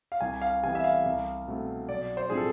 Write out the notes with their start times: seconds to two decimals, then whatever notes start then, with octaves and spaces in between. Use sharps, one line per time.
0.12 F5
0.21 C2 G#5
0.42 F5
0.63 C3 E3 B3 G#5
0.75 E5
0.84 F5
1.05 C2
1.48 B2 A3 C4
1.89 B1 D5
2.17 C5
2.30 A2 F3 A3 C4 G#4
2.37 A4